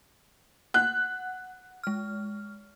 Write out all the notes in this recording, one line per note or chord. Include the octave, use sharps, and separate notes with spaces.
F#5 F#6
G#3 F6